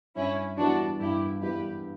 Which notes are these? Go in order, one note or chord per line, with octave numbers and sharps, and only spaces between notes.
G2 C#4 E4
E3 G3 B3 D4 E4 F#4
G2 E4 G4
E3 G3 B3 E4 G4 B4